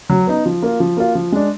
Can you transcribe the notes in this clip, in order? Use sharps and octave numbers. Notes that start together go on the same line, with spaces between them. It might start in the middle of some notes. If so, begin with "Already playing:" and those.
F#3
B3 D#4
F3
A#3 F4
F3
A#3 F4
F3
G#3 D4